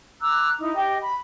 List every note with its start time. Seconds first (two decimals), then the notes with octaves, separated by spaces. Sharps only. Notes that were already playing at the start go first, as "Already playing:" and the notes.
0.21 A#5 D6 E6 F#6
0.60 D#4 E4
0.75 G4 D#5 G5
1.02 B5